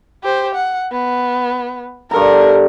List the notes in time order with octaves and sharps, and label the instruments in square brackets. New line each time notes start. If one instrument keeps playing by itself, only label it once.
[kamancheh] G4 C5
F#5
B3
[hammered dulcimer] G2 A4 A#5 [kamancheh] A#4